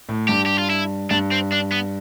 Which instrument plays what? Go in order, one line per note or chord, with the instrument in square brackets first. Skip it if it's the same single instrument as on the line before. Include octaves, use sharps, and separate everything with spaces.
[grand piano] A2
[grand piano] G2 [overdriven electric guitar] G4
[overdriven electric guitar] G4
F4
E4
[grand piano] G2 [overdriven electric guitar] D4
[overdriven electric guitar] C4
D4
B3